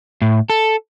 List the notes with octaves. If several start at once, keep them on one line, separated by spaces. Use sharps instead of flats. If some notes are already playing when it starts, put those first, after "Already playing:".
A2
A4